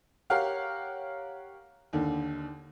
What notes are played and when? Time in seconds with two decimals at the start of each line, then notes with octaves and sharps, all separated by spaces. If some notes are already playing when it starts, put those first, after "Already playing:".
0.30 G4 A#4 C#5 F5 F#5 F6
1.93 D#2 D3 D#3